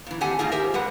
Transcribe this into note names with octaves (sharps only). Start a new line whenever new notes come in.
A#2 E3
A3 C4 G4 A4 F#5 G#5
G#2 D#3 A#3 D#4 F4 G#4
G4 A#4 C5 E5
G3 G#3 B4 F#5